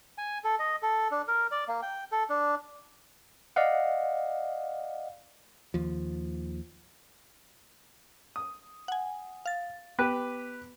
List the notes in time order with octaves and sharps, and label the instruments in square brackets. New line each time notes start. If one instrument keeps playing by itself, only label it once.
[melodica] G#5
A4
D#5
A4
D4
A#4
D5
A#3
G5
A4
D4
[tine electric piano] D5 D#5 F5 F#5
[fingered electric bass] D#2 F3
[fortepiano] D#6
[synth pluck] F#5 G#5
F5 A6
[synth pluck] B3 [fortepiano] G4 B4 F#6